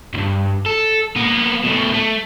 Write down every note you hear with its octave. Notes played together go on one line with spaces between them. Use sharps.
B1 G2
A4
A#3 B3
B2 A3
A3